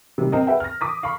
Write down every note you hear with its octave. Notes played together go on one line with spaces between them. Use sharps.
C3 D#3 G3
C4 A#4 D#5
G#4 B4 E5 F#5 G5
F6 A#6
D6 D#6 B6
F5 B5 C#6